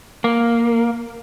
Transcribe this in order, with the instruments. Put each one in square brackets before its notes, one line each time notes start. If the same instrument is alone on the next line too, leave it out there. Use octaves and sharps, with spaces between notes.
[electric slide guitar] A#3